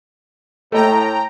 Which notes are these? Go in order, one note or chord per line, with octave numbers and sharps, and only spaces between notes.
A2 A3 D#5 G5 A#5